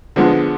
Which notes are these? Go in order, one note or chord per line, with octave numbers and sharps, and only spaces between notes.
D3 F3 G#3 B3